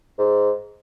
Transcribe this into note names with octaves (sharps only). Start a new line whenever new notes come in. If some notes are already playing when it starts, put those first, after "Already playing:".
G#2